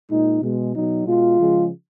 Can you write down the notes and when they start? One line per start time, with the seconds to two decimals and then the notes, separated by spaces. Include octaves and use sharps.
0.10 A#2 G#3 D#4
0.42 B2 G#3
0.74 B2 F#3 D#4
1.06 B2 G#3 F4
1.39 C#3 F3 G#3